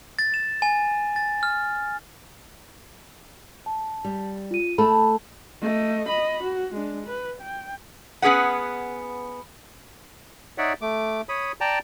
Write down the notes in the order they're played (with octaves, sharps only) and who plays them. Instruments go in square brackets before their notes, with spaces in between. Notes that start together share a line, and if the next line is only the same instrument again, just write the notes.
[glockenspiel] A6
E7
G#5
A6
F6
[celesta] A5
[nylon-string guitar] G3
[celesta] F4 D#7
[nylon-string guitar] A3 A4 [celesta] B5
[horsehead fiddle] A3 D#5
D#5 B5
F#4
G#3 D4
B4
G5
[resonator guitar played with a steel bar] B3 C#4 G#4 B4 F#5
[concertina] D#4 C#5 D5 E5 F#5
A3 D6
C#5 B5 D#6
D5 G5 A5 A#5